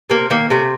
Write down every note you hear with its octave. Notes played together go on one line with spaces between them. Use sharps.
C3 A#3
D#3 A#3
C3 A3